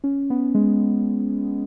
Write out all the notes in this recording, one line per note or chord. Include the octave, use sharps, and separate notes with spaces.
C#4
B3
G#3